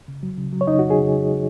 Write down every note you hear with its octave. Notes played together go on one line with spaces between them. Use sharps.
C#3
F#3
C#3
F#3
C#5
C#3 D#4 D#5
F#3 F#4
G#4
C#3